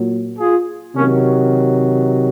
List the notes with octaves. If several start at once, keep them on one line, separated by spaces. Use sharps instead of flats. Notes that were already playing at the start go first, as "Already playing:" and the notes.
Already playing: A#2 F#3
F4 G#4
C3 D#3 F#3 A#3 C#4